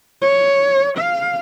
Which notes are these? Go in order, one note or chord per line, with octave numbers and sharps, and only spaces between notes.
C#5
F5